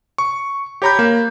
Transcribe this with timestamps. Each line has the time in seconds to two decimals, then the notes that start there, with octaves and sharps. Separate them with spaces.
0.18 C#6
0.82 G4 C#5 A#5 B5 G6
0.99 A#3